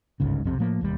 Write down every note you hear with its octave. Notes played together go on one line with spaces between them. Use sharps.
G1 C#2 G#2 C#3
B1 F2 C3
A2 F3 A#3
E1 D#2 G3